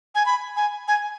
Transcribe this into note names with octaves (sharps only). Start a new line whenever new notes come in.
G#5
B5
G#5
G#5